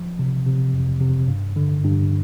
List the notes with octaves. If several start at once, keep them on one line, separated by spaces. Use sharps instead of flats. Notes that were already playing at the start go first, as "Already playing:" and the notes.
Already playing: F3
C3
C3
F2
C3
G2
D3
G2